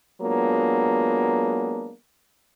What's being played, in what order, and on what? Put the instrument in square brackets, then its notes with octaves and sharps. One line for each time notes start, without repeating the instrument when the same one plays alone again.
[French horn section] F#3 G#3 A#3 B3 D4 F4